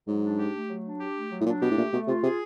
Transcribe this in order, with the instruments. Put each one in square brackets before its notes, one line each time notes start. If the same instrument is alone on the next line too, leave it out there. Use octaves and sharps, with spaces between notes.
[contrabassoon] G#2 [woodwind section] F#3
[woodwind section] D4
G4
A3
F#3
D4
G4
A3
F#3
[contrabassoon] A2
[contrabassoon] A#2 [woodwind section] D4
[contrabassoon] B2 [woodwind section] G4
[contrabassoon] A2
[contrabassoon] A#2 [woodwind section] A3
[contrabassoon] B2 [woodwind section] A3
[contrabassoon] C3 [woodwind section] F4
[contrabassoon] C3 [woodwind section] G#4